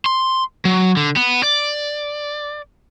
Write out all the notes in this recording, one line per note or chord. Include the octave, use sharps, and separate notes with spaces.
C6
F#3
D3
B3
D5